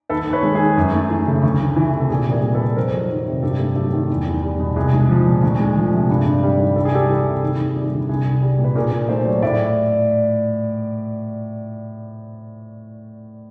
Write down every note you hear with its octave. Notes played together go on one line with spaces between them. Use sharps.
D#2 A4 B4
D#2
B4 C#5
G#3
G#4
D#3
F#2
A3
E3
C#3
D2
A3
E3
C3
A4
A#2 G#4
G3 G#4 A#4
A#2
A4 B4
G3
F2 A#4 C5
F#3
D#3
C3
G2 G4 A4
A3
F#3 G4 A4
D#3
E2
E2
G3
B2
C2 G#4
G#3
F3
A#2
D2
G#3
F3
C3
G2
G2
G3
D#3
C2 A4
G#4
G3 G4 A4
E3
C3
D#2 G#4
D#2
G3 G4
D3
C2 G#4
C2
G3
A#2
B4
A#2 G#4 A#4
A#2
A3 C5 D5
F#3
A2 D5 E5